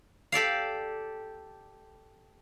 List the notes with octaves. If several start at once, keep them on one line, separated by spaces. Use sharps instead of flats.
G4 A4 D5 F5